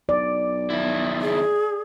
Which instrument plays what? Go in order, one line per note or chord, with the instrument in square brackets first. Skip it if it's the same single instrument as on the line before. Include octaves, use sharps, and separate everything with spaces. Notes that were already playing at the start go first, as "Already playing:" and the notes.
[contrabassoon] B1 [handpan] D5
[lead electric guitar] D#2 E4
[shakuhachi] G#4